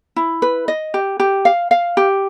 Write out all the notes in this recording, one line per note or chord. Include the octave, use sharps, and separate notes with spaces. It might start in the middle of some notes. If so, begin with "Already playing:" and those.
E4
B4
D#5
G4
G4
F5
F5
G4